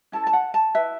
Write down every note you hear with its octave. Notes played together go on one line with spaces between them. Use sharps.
C#4 E4 A4 A5
A5
F#5
A5
E4 B4 E5